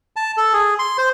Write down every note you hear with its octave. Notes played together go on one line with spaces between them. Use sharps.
A5
A4
G#4
C6
C5